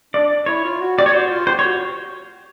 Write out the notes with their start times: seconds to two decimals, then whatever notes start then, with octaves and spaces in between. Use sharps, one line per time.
0.14 D4 D5
0.46 E4 C#5
0.64 F4
0.81 F#4
0.98 G4 D5
1.06 C#5
1.13 F#4 C5
1.30 F4
1.47 G4 C5
1.59 C#5
1.64 F#4